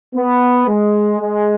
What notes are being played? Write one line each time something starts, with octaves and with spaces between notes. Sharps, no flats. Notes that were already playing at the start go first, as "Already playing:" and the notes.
B3
G#3
G#3